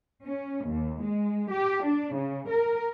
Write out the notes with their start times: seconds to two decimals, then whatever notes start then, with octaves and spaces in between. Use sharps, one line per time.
0.23 C#4
0.66 D#2
1.02 G#3
1.51 G4
1.85 D4
2.15 C#3
2.48 A#4